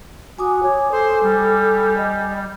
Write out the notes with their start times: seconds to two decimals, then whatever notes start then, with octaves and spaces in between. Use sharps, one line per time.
0.39 F#4 G#5 D6 D#6
0.63 C#5
0.92 A4 C5
1.23 G3
1.97 D#5